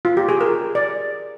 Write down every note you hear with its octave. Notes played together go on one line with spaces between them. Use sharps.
F4
G4
G#4
A#4
D5